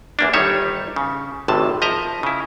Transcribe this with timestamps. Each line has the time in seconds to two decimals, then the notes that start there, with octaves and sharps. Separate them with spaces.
0.19 E2 A#3 D4
0.34 G1 D#3 G3 D#4 C#5 E5
0.96 C#3
1.48 G#1 A2 C3 A5
1.82 F3 D#5 E5 A#5
2.23 C#3 E4